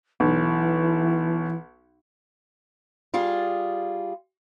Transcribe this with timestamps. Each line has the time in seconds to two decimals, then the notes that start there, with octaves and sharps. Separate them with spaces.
0.20 B1 E3
3.14 G3 F4 G#4